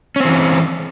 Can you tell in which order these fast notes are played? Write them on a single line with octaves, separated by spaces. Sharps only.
C#4 C4 E3